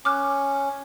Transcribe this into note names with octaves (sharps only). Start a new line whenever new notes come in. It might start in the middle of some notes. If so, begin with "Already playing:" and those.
C#4 D6 F6 F#6